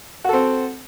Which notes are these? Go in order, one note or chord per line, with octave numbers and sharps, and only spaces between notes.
C4 F#4 A4